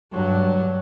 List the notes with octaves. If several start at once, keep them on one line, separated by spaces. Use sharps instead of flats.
G2 F#3